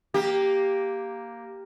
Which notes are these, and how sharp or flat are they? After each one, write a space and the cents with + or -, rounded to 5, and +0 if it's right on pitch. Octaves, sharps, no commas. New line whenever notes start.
A#3 +0 G4 +0